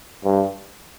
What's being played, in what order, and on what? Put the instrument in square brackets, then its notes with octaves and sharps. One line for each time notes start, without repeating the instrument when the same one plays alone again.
[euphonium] G2